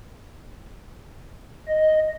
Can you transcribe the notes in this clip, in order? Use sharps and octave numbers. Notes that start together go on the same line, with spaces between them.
D#5